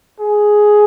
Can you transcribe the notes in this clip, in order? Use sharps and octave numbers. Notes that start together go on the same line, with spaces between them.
G#4